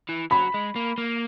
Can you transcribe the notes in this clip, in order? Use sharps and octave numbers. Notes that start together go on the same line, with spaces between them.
E3
F#3 B5
G#3
A#3
A#3